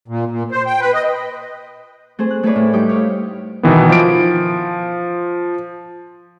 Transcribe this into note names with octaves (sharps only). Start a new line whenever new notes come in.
A#2
A#2
C5
G5
B4
D#5
A3 C4 G#4 C5
F#6
A3 E4 G#4 B4 C#5 D5
A2
G3 D#4 G4 D6
C#5 F5
B2 D#3 E3 B3
F3 D7